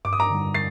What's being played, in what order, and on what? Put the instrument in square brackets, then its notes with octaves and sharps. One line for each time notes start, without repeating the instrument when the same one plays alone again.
[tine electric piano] G2 [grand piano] D6
[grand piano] D#6
A#5 D6
[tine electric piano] D3 G3
[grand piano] A6 C7